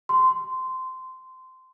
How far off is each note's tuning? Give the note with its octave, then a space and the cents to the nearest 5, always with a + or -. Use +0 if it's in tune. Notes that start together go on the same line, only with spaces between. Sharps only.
C6 -15